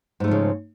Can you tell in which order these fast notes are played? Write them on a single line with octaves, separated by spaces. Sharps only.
G#2 A3 F3 C#3